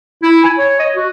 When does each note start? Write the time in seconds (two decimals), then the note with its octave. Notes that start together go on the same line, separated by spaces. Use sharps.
0.23 E4
0.43 G#5
0.57 C#5
0.79 D#5
0.95 F#4